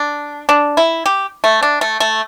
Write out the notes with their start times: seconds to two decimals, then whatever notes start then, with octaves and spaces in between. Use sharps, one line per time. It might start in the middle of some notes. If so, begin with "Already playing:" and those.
Already playing: D4
0.49 D4
0.77 E4
1.06 G4
1.44 A3
1.63 D4
1.81 A3
2.00 A3